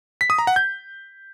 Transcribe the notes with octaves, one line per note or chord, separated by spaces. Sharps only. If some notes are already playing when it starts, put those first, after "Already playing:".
B6
D#6
A#5
F#5
G6